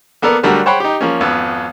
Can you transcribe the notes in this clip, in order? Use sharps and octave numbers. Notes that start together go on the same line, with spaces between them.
A#3 B3 A4 A#4 D5
D3 F#3 G3 A3 D4 A#4
C5 C#5 F#5 G5 B5
D#4 G4
F3 A#3 C#4
G#1 F2 B3 E6